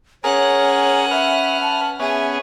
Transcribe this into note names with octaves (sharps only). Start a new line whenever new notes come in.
C#4 G#4 A#4 C#5 F#5
B4 E5 F6
A5
B3 C#4 G#4 E5